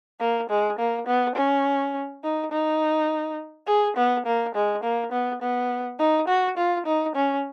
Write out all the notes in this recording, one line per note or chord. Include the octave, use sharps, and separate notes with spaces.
A#3
G#3
A#3
B3
C#4
D#4
D#4
G#4
B3
A#3
G#3
A#3
B3
B3
D#4
F#4
F4
D#4
C#4